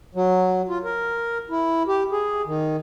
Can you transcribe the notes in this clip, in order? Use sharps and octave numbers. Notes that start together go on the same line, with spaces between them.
F#3
F4
A#4
E4
G4
G#4
D#3